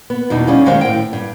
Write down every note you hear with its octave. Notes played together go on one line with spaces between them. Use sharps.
B3
E2 B2 G3 D#4
G3 C#4 F5
F#2 D#3 G#3 C5 F5
A2 G5
G2